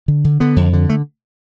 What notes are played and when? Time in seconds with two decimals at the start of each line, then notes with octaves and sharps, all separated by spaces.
0.08 D3
0.24 D3
0.40 D3 B3
0.56 F2
0.73 D3
0.89 A3